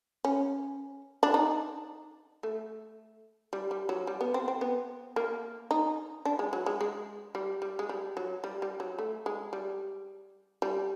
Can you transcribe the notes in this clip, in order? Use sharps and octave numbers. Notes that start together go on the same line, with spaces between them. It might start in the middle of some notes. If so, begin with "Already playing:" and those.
C#4
D4
D#4
A3
G3
G3
F#3
G3
B3
C4
C4
B3
A#3
D#4
D4
G#3
F#3
G#3
G#3
G3
G3
G#3
G3
F#3
G3
G3
F#3
A3
G#3
G3
G3